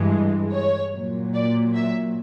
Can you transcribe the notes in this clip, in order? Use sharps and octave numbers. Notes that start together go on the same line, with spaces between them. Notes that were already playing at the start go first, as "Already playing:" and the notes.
Already playing: G2 E3 G#3
C#5
A#2 F#3
D5
E5